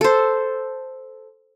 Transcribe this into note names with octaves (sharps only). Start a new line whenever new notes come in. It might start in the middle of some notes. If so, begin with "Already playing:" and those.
A4 C5